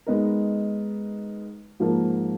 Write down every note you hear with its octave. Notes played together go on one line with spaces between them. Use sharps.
G#3 B3 D#4 A#4
G#2 F3 A#3 F4 A#4